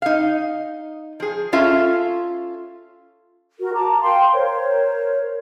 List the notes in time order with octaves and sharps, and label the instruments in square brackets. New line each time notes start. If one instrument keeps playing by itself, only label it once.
[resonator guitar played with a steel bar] D#4 F5
F3 G#4
C#4 F4 A4 E5
[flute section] F#4 A#4
A5 A#5 D6
F5 G5 C6
A#4 C5 C#5